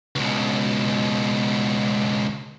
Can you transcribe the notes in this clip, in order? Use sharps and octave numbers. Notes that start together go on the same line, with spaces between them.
C#2 B2